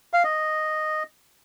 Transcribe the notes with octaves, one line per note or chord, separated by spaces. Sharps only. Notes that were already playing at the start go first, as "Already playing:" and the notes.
F5
D#5